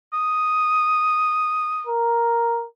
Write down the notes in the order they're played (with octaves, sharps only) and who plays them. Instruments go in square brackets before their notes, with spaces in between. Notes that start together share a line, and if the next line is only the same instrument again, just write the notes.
[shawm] D#6
[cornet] A#4